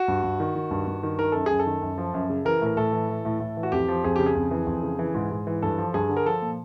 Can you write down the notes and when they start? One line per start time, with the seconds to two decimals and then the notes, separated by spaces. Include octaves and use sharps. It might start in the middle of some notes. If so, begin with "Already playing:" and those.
Already playing: F#4
0.08 G2
0.23 G2
0.40 D#3
0.55 D#3
0.71 G2
0.87 G2
1.03 D#3
1.19 D#3 A#4
1.32 F#2 A4
1.46 F#2 G#4
1.59 A4
1.66 D#3
1.82 F#2
1.98 F3
2.14 F#2
2.30 C#3
2.45 E3 A#4
2.62 A2 A#4
2.77 A2 A4
2.92 E3
3.09 E3
3.25 A2
3.40 A2
3.57 E3
3.63 F#4
3.72 F2 G4
3.88 F3
4.04 F2 G#4
4.16 C#3 G4
4.26 G#4
4.35 F2
4.51 E3
4.67 F2
4.83 C#3
4.99 E3
5.14 G#2
5.31 G#2
5.47 E3
5.62 G2 A4
5.78 F3
5.94 G2 G#4
6.09 D3
6.17 A#4
6.26 F3 A4
6.42 A#2